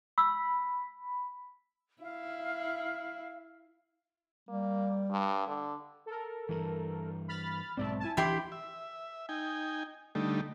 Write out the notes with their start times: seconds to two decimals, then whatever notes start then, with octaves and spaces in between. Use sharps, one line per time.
0.18 B5 E6
2.02 E4 F5
4.49 G3 A#3
5.11 G2
5.47 D3
6.06 A4 A#4
6.49 G2 E3
7.28 B5 F6 A6
7.77 B1 G#2 C4 D5 E5 A5
8.00 E4 G#5 A5
8.17 D2 E3 D4 E4 G4 B5 C6
8.52 E5
9.29 D#4 G5 G#5
10.15 D3 G3 A3 D#4